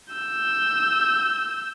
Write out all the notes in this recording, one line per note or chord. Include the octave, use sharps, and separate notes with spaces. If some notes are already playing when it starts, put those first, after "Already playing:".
E6 G6